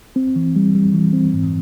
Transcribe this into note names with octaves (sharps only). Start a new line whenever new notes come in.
C4
E3
G3
G3
E3
C4
G#2